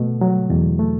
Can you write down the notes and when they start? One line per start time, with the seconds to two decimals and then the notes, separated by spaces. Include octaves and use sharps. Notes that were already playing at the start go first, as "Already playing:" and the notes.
Already playing: B2 A3
0.21 F#3
0.50 E2
0.79 A3